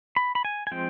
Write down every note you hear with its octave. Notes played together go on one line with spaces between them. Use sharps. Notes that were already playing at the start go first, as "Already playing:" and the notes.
B5
B5
G#5
G#5
F3 G#3 C4 G5